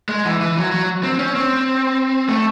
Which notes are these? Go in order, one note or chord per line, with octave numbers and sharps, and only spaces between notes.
G#3
E3
E3
F#3
F#3
C4
C#4
C4
A3